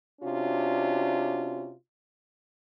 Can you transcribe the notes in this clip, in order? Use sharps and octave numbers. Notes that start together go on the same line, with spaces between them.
C3 C#4 D4 F4 F#4